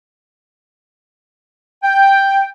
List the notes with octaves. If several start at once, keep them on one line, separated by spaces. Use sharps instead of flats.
G5